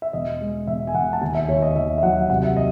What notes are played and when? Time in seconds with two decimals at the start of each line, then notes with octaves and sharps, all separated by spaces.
0.02 E5
0.13 E1 D#5
0.41 G#3
0.67 E1 E5
0.87 G#5
0.94 E1 F#5
1.13 A5
1.21 D#2 G#5
1.35 E5
1.48 D#2 C#5
1.62 D#5
1.76 D#2 E5
1.98 E5
2.03 F#3 F#5
2.30 C2 F#5
2.43 E5
2.57 D#5